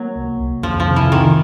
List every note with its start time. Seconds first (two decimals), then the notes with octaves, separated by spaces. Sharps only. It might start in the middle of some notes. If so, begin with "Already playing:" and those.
Already playing: F#3 A#3
0.16 C2
0.39 C2
0.63 F2 F3
0.80 F3
0.88 C3
0.96 E3
1.12 C3 D#3